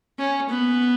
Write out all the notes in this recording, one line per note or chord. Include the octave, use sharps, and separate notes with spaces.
C#4
B3